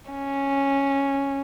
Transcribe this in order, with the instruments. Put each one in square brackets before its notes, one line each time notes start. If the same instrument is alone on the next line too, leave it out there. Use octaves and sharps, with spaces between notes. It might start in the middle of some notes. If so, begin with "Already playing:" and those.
[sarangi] C#4